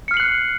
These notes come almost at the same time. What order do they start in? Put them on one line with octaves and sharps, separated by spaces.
C#7 F6 C7 F#7 F#6